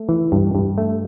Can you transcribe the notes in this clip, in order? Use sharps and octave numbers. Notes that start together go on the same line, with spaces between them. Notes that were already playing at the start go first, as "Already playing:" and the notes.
Already playing: A3
E3
G2
G2
A3